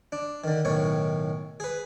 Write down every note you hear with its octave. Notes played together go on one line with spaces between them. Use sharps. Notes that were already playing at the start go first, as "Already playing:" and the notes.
D4
D3 D#3
B1 A2 D#3 C#5
G#4 B4